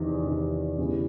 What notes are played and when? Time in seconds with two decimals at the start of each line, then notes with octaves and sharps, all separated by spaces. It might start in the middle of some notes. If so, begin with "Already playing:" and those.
Already playing: E2 C3 D#3
0.22 E2 C3 D#3
0.78 E2 C#3 E3 G3 B3